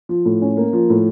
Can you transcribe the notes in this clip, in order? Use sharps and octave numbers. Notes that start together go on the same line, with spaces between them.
F3
A2
C#4
A#3
F3
A2